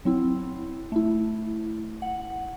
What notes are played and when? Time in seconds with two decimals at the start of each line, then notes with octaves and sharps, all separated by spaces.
0.05 F#3 C4 E4
0.92 A3 E4
2.02 F#5